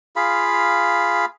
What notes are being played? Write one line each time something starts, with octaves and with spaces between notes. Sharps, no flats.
F4 G#4 F5 B5